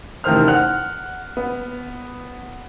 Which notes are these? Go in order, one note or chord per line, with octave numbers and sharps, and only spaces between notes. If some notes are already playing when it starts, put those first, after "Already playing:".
A1 C3 D#3 C5 F6
F#5 F6 F#6
B3